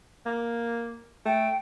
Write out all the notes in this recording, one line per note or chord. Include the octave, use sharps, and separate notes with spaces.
A#3
A3 G5